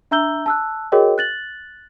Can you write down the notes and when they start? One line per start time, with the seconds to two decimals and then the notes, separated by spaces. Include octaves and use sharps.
0.11 D4 E5 A#5 E6 G6 G7
0.46 A5 E6 F#6
0.92 F#4 G#4 A#4 C#5 D#5 G5
1.18 F#6 A6 F#7